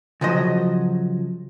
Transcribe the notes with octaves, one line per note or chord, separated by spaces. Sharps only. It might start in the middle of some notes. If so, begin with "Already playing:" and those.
C#3 F3 F#3 D#5